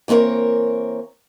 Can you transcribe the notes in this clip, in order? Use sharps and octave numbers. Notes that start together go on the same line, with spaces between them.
E3 A#3 C4 A#4 C#5